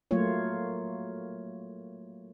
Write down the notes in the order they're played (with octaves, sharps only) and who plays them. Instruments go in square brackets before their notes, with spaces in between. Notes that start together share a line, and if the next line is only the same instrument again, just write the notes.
[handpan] F#3 A3 A#3 F4 C#5